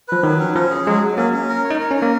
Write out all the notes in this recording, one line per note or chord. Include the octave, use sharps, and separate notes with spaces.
F3 B4
D#3 F#3
C#4
F3 C#4
G#4
F#3 G#3
F#3
A#3 C#4
C#4
A#4
C#5
D#4
A#4
C#4
A#4
A#3